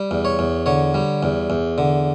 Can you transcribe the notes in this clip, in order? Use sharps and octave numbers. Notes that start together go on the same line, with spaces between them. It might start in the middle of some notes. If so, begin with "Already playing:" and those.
Already playing: G3
E2
C#5
E2
D3 C#5
G3
E2
E2
D3